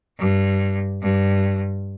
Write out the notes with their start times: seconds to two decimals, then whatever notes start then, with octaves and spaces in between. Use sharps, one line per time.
0.20 G2
1.03 G2